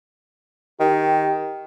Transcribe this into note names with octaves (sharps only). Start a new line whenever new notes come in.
D#3 G4